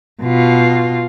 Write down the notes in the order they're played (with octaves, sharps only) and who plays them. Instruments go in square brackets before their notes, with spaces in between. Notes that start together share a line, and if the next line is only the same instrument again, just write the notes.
[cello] B2 F4